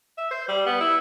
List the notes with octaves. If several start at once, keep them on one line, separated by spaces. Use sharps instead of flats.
E5
C5
G3
B3
E4